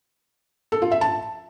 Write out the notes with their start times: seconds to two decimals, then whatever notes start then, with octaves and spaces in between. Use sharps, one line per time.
0.72 A4
0.82 F4
0.92 E5
1.01 A5